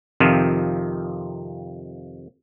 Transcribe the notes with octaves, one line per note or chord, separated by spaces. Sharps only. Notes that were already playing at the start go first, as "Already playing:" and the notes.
F2 C3 D#3 F3